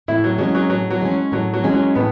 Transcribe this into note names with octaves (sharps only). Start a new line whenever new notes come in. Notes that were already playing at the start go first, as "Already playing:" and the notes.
A2 E4
F#3
F#3 G#3 C#4
F#3
A2 F#3
F#3
G#3 C#4
A2 F#3
F#3
G#3 C#4
F#3
A2 B3